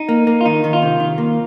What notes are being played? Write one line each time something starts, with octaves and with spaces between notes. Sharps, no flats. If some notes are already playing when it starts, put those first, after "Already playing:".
Already playing: D#4
A#3
A#3
F4
D#3 D#4
D#3
F4
C3
D#3
A#3